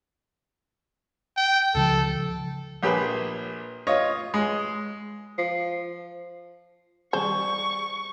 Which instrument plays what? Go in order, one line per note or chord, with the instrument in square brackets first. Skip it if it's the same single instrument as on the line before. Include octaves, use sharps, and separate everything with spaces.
[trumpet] G5
[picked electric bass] C#2 C#3 F3 [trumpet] A4
[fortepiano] A#1 G4 G#4 B4
F4 C#5 D#5
G#3
[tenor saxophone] F3
[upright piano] G3 G#4 [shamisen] C5 [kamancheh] C#6